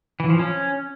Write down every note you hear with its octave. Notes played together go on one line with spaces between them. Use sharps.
E3
F3
C#4